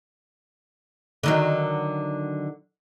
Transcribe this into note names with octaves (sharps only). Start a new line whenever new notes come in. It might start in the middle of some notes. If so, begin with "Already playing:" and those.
D3 D#3 F#3